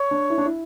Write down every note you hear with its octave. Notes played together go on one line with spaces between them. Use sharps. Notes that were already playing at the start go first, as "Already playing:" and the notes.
Already playing: C#5
D4
E4
D4
E4